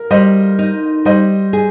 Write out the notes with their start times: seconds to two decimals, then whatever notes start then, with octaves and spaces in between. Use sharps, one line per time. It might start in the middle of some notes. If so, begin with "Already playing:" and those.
Already playing: A#4
0.10 G3 C5 D#5
0.59 D#4
1.05 G3 C5 D#5
1.53 G#4